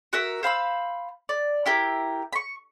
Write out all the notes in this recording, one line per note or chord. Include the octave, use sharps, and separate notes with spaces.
F#4 A#4 E5
C5 F5 B5 E6
D5
E4 G4 A#4
B5 C#6